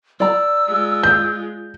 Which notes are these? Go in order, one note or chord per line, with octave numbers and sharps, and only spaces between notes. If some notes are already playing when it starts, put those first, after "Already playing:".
D5 A#5 E6
G#3 F4
G6